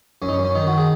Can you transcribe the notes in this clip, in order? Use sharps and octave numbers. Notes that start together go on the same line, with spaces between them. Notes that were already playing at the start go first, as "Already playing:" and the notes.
F#2 C#4
D#4
C#4
F#2
C#4
D#3 D#4
F#4
D#3
G#4